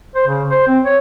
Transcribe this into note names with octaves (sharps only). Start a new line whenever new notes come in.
C5
C#3
C5
C4
C#5